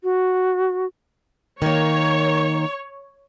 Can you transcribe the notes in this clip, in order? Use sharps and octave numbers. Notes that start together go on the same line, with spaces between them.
F#4
D#3 A#3 C#5